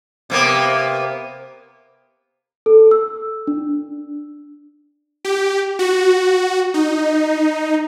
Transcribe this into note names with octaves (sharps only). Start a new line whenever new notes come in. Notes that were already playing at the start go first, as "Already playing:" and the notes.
C3 A#3 B3
A4
E6
D4
G4
F#4
D#4